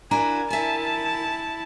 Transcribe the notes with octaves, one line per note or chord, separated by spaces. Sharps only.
D4 E4 F#4 A#4 G#5 A#5
E4 E5 G#5 A5